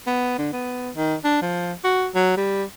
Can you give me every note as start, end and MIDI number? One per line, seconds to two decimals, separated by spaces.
0.07 0.34 59
0.38 0.51 50
0.52 0.90 59
0.96 1.15 51
1.24 1.42 62
1.42 1.73 53
1.84 2.07 66
2.15 2.37 54
2.37 2.63 55